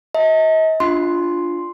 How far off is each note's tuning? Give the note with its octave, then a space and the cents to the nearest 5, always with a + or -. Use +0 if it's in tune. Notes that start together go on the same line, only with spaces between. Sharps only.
D#5 +40 A5 +40
D4 +0 F4 -5 C6 +0